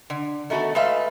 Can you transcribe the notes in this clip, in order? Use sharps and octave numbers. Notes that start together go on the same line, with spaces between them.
D3
D#3 A3 B3 F#4 A4
G#3 A3 B4 E5 F5